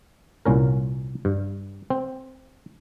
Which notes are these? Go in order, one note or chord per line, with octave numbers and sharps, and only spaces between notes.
C2 A#2 C#4 A#4
G2
C4